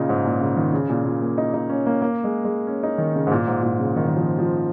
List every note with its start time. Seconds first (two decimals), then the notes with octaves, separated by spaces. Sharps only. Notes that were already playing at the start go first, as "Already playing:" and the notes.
Already playing: A#2 C#3 D#4 F4
0.09 G#2
0.25 A#2
0.41 C#3
0.57 D#3
0.73 C#3
0.90 A#2
1.05 A#2
1.22 A#3
1.38 D#4
1.54 D#4
1.69 C#4
1.86 A#3
2.02 A#3
2.24 G#3
2.44 G#3
2.67 C#4
2.83 D#4
2.98 D#3
3.16 C#3
3.27 G#2
3.31 A#2
3.48 G#2
3.63 A#2
3.80 C#3
3.96 D#3
4.07 D#3
4.16 F3
4.39 F3